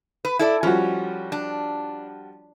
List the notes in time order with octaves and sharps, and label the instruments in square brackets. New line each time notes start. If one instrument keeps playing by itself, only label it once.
[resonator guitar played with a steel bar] B4
E4 A4 D5
[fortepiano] F3 G3 F#4 [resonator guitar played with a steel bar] C#4
[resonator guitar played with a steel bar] D4